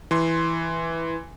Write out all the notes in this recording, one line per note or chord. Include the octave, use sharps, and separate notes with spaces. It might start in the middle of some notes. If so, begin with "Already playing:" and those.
E3 C6